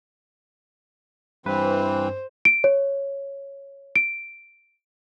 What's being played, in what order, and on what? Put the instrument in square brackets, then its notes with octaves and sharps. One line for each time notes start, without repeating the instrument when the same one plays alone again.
[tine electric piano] G2 B4 [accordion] E3 C4 [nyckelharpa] C5
[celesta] D7
C#5
D7